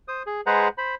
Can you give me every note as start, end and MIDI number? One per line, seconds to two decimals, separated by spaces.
0.08 0.23 72
0.08 0.23 87
0.26 0.41 68
0.46 0.68 56
0.46 0.68 68
0.46 0.68 71
0.46 0.68 72
0.46 0.68 78
0.46 0.68 82
0.78 0.95 72
0.78 0.95 83